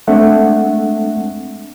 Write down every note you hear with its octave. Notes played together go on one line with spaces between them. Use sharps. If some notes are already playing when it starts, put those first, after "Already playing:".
G#3 A3 C4 D4 E5 F#5